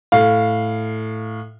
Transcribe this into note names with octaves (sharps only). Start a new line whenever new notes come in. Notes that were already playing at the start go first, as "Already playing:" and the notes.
A2 F5